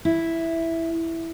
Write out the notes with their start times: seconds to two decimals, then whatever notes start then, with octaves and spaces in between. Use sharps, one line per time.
0.05 E4